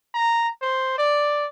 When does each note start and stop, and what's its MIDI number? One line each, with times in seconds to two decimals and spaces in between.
0.14 0.48 82
0.62 0.94 72
0.98 1.46 74